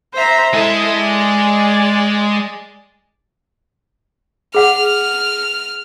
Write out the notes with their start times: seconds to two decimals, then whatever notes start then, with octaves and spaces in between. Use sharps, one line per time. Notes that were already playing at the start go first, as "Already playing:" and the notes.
0.14 C5 E5 A#5
0.54 G#3 E4 A4 D#5
1.00 G#4 D5
4.55 G#4 F#5 F6